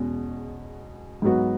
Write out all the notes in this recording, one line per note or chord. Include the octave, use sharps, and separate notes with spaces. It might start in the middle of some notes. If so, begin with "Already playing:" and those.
Already playing: E2 B2 G#3 C#4
G#2 F#3 B3 F#4